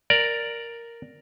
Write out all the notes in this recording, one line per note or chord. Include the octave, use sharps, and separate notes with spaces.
A#4 D5